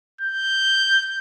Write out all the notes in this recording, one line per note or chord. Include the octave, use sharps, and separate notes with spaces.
G6